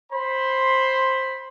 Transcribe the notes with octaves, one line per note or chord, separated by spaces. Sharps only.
C5 B5 C6